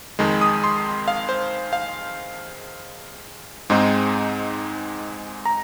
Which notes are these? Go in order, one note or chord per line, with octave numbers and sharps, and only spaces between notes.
F2 D#3 G#3
D#6
C6
F5
C5
F5
G#2 G#3 C4 D#4
A#5